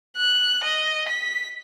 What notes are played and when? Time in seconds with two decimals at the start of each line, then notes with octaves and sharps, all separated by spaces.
0.16 F#6
0.64 D#5
1.08 B6